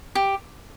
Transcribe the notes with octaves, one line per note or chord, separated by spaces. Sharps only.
G4